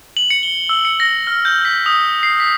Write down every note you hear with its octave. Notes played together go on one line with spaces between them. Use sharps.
F#7
C#7
G7
E6
C#7
A#6
F6
G6
B6
D#6
C7
B6